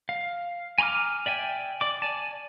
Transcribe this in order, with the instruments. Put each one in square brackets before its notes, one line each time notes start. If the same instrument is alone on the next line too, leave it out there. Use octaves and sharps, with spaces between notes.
[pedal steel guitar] F5
G#5 A#5 C6 D6 F6
D5 E5 G5 G#5
D5 D6
D5 G#5 A5